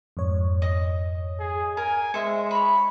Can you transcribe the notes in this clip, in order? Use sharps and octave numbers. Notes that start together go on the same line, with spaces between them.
F2 G#2 C#5
D#5
G#4
A#4 G#5
G#3 C5 E5 C#7
C#5 B5